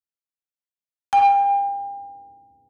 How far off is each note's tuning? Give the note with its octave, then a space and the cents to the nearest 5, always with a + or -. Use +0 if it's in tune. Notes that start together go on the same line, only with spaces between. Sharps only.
G5 +35